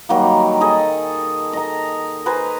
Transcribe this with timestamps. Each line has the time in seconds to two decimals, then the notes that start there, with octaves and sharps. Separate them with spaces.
0.09 D#3 F#3 G3 A#3
0.61 G#4 A4 D#5 G#5
1.53 D#5 A#5
2.26 B4 C5 G#5 A#5